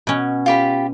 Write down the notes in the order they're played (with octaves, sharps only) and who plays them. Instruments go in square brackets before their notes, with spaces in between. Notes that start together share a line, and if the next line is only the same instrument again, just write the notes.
[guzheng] B2 C#4
[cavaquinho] F4 G4 B5